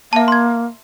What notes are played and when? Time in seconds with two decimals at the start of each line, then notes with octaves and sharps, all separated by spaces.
0.13 A#3 E5 A5
0.28 C6 G#6